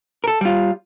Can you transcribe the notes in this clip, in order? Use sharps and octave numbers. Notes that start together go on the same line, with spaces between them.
A4 A#4
G3 F4